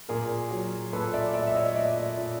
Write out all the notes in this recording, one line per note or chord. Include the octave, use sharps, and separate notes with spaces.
A#2 G#4 A#4
F#3
A#2 A4 B4
D5 E5
A#2 D5 E5
E5
C#5 D#5
A#2 D5 E5
A#2